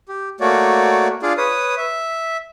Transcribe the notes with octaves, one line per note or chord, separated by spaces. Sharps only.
G4
A3 A#3 F#4 C#5 D5
D4 F4 G#4 D5 F5
B4 C#5 D#6
E5